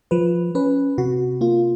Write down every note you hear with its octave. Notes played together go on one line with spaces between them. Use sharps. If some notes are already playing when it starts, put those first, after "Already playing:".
F3 B4
C#4 B4
C3 F#4
A#3 F4